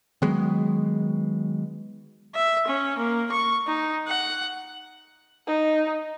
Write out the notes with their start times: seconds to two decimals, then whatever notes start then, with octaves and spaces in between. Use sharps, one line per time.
0.22 D#3 F#3 G#3 B3
2.35 E5
2.67 C#4
2.98 A#3
3.31 C#6
3.67 D#4
4.08 F#5
5.47 D#4